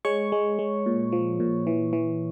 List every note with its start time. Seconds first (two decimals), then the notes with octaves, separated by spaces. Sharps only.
0.05 G#3 C#5 C#6
0.32 G#3
0.59 G#3
0.86 A#2
1.12 F3
1.40 A#2
1.67 E3
1.93 E3